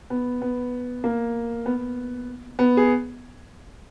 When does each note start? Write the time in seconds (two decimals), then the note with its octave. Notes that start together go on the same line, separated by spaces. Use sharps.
0.10 B3
0.42 B3
1.04 A#3
1.66 B3
2.59 B3
2.77 G#4